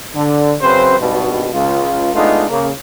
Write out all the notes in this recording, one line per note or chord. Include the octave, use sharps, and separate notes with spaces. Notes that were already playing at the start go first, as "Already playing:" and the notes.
D3
F#2 C#3 C4 B4 C5
G#1 G2 B2
C#2 F4
G#3 A3 B3 D4 D#4 F4
C#3 A#3